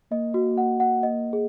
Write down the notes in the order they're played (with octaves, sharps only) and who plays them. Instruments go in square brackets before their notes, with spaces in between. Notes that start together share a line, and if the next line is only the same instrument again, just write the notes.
[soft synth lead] A#3 [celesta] D#5
[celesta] F#4
F#5
F#5
D#5
G#4